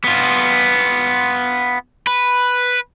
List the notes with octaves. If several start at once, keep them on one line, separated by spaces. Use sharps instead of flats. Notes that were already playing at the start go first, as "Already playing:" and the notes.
B3 F4
B4